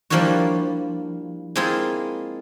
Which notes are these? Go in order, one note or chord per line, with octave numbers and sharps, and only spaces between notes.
F3 G3 A#3 D4 E4 F#4
G#3 A#3 C4 E4 F4 G#4